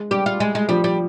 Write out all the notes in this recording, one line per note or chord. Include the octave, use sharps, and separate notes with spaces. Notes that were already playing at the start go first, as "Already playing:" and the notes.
Already playing: G#3
G3 G4
F4
G#3
G#3
F3 G3
G3